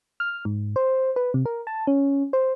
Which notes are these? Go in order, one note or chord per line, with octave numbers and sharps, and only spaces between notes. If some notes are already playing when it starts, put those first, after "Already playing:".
F6
G#2
C5
B4
C3
A#4
A5
C#4
C5